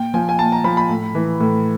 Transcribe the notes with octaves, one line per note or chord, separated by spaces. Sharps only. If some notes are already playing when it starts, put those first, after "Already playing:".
Already playing: A#2 G5
F3 G#5
G#5
A#2 A5
A#5
F3 B5
B5
A2
E3
A2